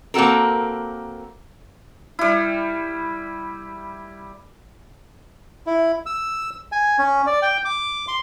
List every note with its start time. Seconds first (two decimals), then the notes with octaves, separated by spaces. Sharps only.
0.14 A#3 C4 F#4 A4 A#4
2.19 G3 E4
5.67 E4
6.06 E6
6.72 G#5
6.99 C#4
7.27 D5
7.42 G5
7.65 D6
8.08 C6